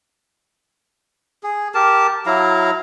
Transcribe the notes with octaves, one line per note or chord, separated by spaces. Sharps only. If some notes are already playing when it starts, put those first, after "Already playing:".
G#4
G4 A#4 A5
F#3 E4 F5 A#5